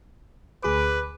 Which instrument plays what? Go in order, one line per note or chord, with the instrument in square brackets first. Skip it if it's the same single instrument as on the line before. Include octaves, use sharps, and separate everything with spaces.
[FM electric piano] D2 G#4 D6 [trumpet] B4